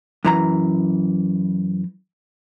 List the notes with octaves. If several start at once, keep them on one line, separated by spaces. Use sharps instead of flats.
F#2 E3 A#5